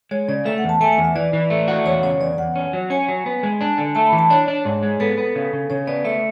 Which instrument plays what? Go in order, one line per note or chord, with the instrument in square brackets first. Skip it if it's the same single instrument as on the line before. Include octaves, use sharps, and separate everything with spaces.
[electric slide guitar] G#3 [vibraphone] C#5
[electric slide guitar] C#3 [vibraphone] D5
[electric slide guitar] A3 [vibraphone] E5
[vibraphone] F#5
[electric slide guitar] E2
[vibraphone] A5
[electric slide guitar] A3 [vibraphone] G#5
[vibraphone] G#5
[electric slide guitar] E2
[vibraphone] E5
[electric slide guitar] E3 [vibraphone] D5
[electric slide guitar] E3
A3
F#4
[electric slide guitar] E2 [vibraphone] C#5
[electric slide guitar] C#3 [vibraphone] C#5
[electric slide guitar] E2 [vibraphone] D5
[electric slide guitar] E2 [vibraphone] F#5
[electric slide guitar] C#4
F#3
[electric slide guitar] C#4 [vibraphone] G#5
[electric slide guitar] F#3
B3
G#3
D4
D3
[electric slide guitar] A3 [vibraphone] A5
[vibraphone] B5
[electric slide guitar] E3
[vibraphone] A5
[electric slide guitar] D4 [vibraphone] C#5
[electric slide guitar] D4
G#2
G#3
[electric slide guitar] B3 [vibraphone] A4
[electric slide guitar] B3
C#3
C#3
[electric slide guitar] C#3 [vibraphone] C#5
[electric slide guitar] B3 [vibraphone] D5
[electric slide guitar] A3 [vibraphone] E5